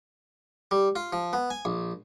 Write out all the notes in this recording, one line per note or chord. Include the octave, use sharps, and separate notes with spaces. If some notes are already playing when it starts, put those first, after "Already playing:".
G3
F4
F3
B3
G#5
A#1